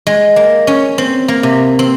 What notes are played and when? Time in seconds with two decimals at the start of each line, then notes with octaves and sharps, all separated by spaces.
0.07 G#3
0.36 A#3
0.67 C#4
0.98 C4
1.28 A#3
1.43 C3
1.79 C4